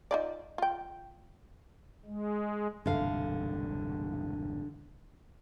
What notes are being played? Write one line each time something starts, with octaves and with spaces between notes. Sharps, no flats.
D#4 F4 D5
F4 G5
G#3
E1 C2 G2 D3 F5